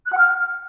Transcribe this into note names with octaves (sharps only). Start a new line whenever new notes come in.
F#6
F#5
F6